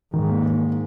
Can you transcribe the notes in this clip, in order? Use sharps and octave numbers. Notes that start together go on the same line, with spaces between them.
G#2 D#3
A#3